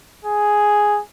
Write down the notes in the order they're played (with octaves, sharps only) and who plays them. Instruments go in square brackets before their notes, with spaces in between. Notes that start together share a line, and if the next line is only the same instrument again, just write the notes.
[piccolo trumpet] G#4